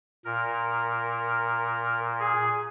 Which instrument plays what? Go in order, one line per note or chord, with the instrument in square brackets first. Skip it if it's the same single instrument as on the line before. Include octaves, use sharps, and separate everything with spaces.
[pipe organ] A#2 A#4
G#4